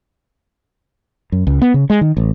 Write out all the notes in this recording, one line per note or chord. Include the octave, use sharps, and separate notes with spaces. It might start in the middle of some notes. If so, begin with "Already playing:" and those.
F#2
C#2
B3
C#3
G#3
D#3
A1